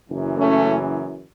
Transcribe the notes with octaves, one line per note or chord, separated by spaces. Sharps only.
F#1 F#2 E3
A3 C#4